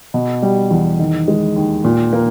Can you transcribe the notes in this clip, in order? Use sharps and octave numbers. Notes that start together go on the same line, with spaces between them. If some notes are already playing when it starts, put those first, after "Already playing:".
B2
G3
E2
D#3
G#3
D#2
A#2
A#3